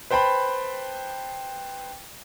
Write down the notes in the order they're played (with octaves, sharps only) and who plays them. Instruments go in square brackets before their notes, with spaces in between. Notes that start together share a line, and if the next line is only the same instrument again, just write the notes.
[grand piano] B4 C5 G5 A5 B5